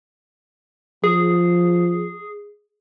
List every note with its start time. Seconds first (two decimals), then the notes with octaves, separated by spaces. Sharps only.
1.04 F3 G#4